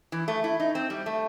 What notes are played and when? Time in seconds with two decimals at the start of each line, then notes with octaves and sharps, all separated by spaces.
0.12 E3
0.28 A3
0.44 E4
0.60 D#4
0.75 C4
0.90 G3
1.06 A3